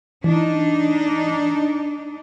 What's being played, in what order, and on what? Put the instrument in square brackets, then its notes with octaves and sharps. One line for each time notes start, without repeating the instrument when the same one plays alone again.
[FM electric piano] E3 [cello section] D4 D#4